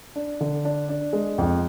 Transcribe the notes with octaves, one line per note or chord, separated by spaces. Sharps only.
D4
D3
D4
D4
G#3
F2